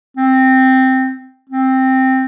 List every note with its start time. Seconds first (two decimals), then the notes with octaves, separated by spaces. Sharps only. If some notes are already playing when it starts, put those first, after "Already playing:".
0.17 C4
1.49 C4